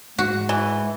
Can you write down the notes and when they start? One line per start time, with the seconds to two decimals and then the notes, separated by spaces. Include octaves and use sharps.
0.18 G#2 F#4
0.49 E3